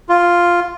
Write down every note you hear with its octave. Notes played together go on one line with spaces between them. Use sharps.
F4